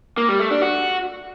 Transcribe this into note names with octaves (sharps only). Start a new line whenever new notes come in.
A#3
G3
A3
D4
F#4